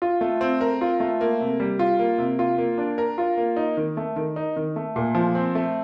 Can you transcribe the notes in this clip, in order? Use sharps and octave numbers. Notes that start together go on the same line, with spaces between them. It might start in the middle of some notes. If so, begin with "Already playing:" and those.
F4
A3
C4
A#4
F4
A3
A#3
C3
G3
F4
A#3
C3
F4
A#3
D4
A#4
F4
A#3
D#4
D#3
A3
D#3
D#4
D#3
A3
A#2
F3
C4
A3